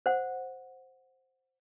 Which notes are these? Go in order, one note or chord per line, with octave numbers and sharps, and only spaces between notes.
C5 F#5